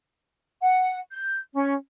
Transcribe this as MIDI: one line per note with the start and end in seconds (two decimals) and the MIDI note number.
0.62 0.98 78
1.12 1.38 91
1.54 1.74 61